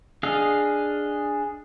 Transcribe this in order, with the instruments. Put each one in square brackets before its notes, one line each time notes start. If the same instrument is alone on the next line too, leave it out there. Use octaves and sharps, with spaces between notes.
[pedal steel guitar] D4 G#4 D#5 F5